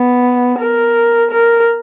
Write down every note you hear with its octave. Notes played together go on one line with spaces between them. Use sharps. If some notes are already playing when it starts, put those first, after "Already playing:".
Already playing: B3
A#4
A#4